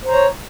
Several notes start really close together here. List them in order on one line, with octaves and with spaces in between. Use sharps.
C5 A#5 C#5